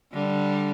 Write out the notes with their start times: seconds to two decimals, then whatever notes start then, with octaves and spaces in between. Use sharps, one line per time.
0.13 D3 G3